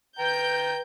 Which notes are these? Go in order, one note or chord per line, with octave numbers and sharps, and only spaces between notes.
B4 G5 A#5 G6